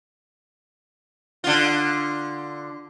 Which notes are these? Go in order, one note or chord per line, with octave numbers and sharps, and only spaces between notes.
D3 F4